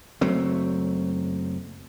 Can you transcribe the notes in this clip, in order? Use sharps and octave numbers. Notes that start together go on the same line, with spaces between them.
F#1 F#3 A3 C4